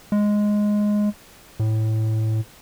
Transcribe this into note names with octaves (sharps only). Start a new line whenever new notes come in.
G#3
A2